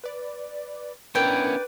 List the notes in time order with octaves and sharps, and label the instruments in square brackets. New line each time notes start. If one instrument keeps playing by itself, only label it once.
[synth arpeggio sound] B4 D5
[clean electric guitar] B3 C#4 E4 [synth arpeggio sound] D4 A#4 [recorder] B4 [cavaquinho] D5 G5